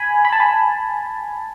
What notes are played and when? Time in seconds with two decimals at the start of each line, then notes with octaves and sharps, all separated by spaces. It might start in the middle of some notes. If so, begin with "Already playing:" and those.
Already playing: G#5 B5
0.25 B5
0.32 A5
0.40 G#5 B5